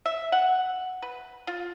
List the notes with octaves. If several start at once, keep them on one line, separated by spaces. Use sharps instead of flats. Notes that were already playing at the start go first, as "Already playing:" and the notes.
E5
F#5
B4
F4